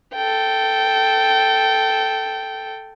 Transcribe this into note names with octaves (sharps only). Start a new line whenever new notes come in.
A4 G5